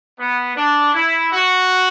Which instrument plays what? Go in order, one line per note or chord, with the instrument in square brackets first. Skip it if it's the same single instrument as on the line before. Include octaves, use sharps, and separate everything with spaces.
[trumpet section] B3
D4
E4
F#4